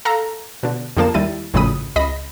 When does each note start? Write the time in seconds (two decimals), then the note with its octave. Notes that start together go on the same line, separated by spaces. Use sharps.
0.05 A4 F5 A#5
0.63 B2 D3
0.97 F2 D3 F3 A#3 A5 E7
1.14 D#2 G3 E4 A6 D#7
1.54 G#1 F2 A2 C#3 B5 D#6
1.96 C#2 D#5 B5 A#6